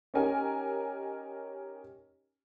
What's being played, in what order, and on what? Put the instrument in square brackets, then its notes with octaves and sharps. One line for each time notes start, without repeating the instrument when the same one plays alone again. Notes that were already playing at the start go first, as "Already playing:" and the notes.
[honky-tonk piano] C#4 D#4 G4 A#4 G#5